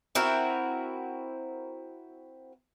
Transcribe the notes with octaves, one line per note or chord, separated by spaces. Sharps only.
C4 E4 F#4 A#4